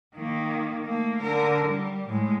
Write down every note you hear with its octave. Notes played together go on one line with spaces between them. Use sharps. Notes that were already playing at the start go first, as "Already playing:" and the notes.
D#3 A#3
A3 A#3
D3 A#4
G3
A2 G#3